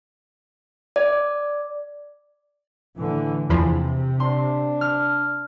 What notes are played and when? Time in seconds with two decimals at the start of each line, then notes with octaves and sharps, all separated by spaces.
0.96 D5
2.98 A2 D3 E3
3.50 E2 C3 E3 F3
4.20 D4 C6
4.81 F6